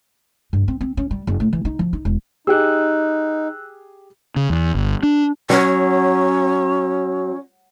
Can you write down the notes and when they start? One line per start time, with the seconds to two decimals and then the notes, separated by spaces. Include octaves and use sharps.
0.53 G2
0.68 C4
0.81 C4
0.97 C#4
1.11 G3
1.27 F#1
1.40 A2
1.53 E3
1.65 D#4
1.79 F3
1.93 D#4
2.05 E1
2.47 D#4 G4 G#4 E6 F#6
4.36 C#3
4.50 E2
4.75 G1
5.03 D4
5.50 F#3 C#4